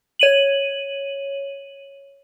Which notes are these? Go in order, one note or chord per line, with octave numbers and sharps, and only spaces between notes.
C#5 D#7 F#7